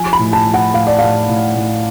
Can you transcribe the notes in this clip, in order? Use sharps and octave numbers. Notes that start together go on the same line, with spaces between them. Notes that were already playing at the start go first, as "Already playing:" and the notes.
Already playing: F3 G#5
B5
A2
A5
F3
F#5
A2 F5
D5
A2 F5
A2
A2